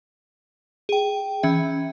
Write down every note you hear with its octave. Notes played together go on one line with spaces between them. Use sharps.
G#4 G5
E3 C#4 E5